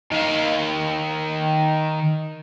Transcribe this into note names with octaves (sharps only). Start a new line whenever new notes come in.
D#3 F5